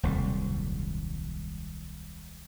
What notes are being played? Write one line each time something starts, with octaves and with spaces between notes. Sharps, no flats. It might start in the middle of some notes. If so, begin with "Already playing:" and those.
D#1 C2 F#2 G3